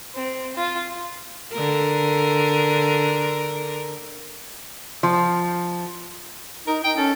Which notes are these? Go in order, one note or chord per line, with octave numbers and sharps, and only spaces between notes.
C4
F4
D3 A#4
F3
D#4 A#4
D#4 G5
C#4 A4